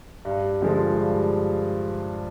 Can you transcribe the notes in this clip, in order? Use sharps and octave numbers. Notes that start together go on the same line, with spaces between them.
G2
D3 F3 G#3
G2